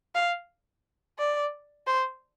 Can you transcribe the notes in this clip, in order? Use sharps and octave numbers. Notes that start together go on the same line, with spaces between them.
F5
D5
C5